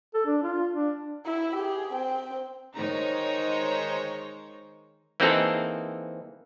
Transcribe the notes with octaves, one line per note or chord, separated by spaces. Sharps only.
A4
D4
F4
D4
E4
G4 G#4
C4 G5
D#3 G#3 D#4 C5 C#5 A#5
E3 A#3 C4 D#4 G#4 A4